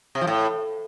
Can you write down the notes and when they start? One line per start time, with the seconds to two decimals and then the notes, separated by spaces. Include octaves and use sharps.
0.15 C3
0.21 F3
0.27 A2